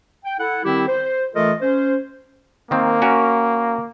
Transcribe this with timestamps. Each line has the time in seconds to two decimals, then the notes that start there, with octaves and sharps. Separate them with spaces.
0.25 G5
0.40 E4 A4 F#5
0.64 D#3 G3 C4 E4 G4
0.88 C5
1.35 E3 A3 F4 A4 A#4 D#5
1.61 C#4 C5
2.71 D#3 A#3 C4
3.02 C#4 F#4 A#4